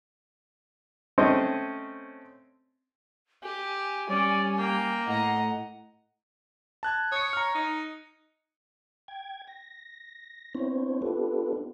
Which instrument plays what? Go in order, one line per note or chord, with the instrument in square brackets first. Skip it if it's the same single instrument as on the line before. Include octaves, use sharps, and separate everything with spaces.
[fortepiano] A3 C4 C#4 C5 D#5
[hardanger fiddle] G4 [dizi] G#5
[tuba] G3 [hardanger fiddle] C#4 [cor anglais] D5
[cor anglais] A#3 [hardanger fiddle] G5
[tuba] A2 [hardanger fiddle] D#5 A#5 [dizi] F#5
[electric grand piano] A5 F#6 G#6
[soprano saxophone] C#5 [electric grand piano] D#6 C#7
[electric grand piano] A#5 F6
[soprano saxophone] D#4
[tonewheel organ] G5 G#6
A#6
B3 C4 D4 E4 C5 C#5
B3 D4 F4 G4 A4 B4